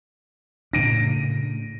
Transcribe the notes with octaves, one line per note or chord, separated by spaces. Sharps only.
A2 C#3 D4 A#6 D7 D#7